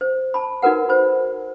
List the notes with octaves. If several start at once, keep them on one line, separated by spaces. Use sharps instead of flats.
C5
A5 B5
D#4 F#4 A#4 B4 F#5
C5 B5